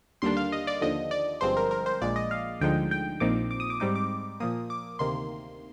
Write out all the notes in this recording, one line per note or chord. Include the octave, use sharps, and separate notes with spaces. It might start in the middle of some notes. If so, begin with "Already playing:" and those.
D#2 D3 G3 A#3 D4 C6
F5
D#5
D5
D#2 D3 F3 D#5
D5
G1 G2 F3 G#3 C4 C5
A#4
A#4
C5
A#1 A#2 G#3 D5
D#5
F5
D2 D3 F3 G#3 D#4 G5
G5
A#1 A#2 F3 C4 D#4 D6
D6
D#6
D6
G#2 G3 C4 D#4 D6
D6
A#2 F3 A#3 D#6
D6
D2 C3 D#3 A#3 C6